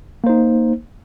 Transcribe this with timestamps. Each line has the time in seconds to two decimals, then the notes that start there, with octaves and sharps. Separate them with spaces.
0.24 A#3
0.27 C5
0.29 D#4